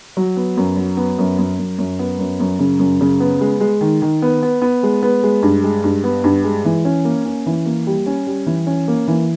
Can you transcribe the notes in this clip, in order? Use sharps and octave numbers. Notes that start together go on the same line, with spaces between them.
F#3
B3
F#2
F#3
B3
F#2
F#2
F#2
F#2
B3
F#2
F#2
C#3
F#2
C#3
B3
G#3
G#3
D#3
D#3
B3
B3
B3
G#3
B3
G#3
G2
G#3
G2
B3
G2
G#3
E3
C#4
A#3
C#4
E3
A#3
G3
C#4
G3
E3
C#4
A#3
E3